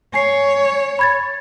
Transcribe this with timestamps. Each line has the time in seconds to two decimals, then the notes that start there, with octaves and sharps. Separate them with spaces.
0.14 C#5 G#5 C7
0.99 B5 G#6 A6